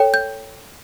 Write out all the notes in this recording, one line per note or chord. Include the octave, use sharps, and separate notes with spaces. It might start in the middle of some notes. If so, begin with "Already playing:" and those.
Already playing: A4 C#5 G5
G6